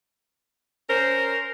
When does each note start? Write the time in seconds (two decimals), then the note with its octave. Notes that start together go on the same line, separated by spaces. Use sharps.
0.89 C#4 A#4 C5